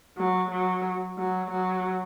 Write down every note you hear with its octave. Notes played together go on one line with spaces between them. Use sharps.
F#3
F#3
F#3
F#3